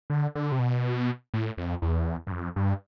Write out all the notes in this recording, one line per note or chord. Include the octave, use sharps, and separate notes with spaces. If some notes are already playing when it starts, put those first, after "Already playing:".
D3
D3
C3
B2
A2
F2
E2
G2
F2
G2